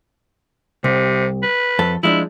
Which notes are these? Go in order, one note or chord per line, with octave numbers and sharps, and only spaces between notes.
C2 C3
B4
F2 A4
F3 G#3 D4 E4